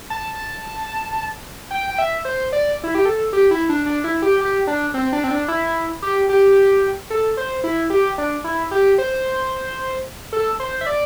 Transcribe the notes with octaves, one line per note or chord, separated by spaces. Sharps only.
A5
G5
G5
E5
C5
D5
E4
G4
A4
G4
E4
D4
D4
E4
G4
G4
D4
C4
D4
C4
D4
E4
G4
G4
A4
C5
E4
G4
D4
E4
G4
C5
A4
C5
E5
D5